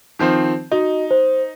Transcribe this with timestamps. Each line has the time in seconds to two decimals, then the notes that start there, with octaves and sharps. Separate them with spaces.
0.19 D#3 F3 C4
0.72 D#4 F#4 D#5
1.11 C5